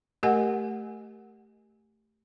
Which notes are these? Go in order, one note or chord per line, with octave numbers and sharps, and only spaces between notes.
A3 G4 A#4 D#5 F#5 G#5